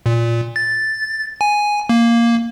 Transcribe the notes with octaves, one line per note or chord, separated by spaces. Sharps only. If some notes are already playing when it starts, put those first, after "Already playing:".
A#2
A6
G#5
A#3